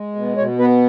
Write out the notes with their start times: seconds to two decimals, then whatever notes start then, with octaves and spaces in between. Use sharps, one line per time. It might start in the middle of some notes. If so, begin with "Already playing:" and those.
Already playing: G#3
0.15 B2
0.37 B2 C#5
0.59 B3 B4